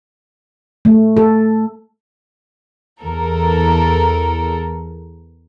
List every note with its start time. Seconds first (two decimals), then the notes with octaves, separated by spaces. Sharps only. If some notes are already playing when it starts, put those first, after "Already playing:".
0.85 A3
1.17 A4
3.01 E2 A4 A#4